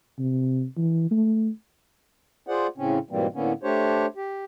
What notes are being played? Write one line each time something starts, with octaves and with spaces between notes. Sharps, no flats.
C3
E3
A3
F4 G#4 C5 D5 F#5
A2 C#3 C4 C#4
G#2 B2 E3 G3 A#3 C4
A2 D3 A#3 B3 C#4
A3 D4 G4 C5 C#5
G4